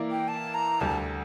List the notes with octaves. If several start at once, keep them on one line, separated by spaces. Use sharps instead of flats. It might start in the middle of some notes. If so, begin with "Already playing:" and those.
Already playing: E3 A#3 E4 A#4 D5
G5
A5
A#5
D2 D3 G3 A5